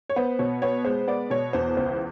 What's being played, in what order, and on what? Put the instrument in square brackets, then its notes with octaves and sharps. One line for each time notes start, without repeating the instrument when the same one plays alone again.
[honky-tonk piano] C#5
B3 C5
B2 C#5
B3 C#5
G#3 C5
B3 D5
B2 C#5
E2 C5
C#2 C5